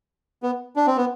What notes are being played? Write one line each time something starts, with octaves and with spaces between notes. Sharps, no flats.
B3
D4
C4
B3